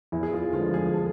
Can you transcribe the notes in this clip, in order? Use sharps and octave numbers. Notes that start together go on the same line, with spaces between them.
E2 E4
G#4
F4
D3 F3 G#3 F4
G#4
A4